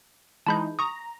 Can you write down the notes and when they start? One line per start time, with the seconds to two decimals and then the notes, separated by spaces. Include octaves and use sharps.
0.47 E3 G#3 D#4 A5 B5 G6
0.79 A#5 C#6 D#6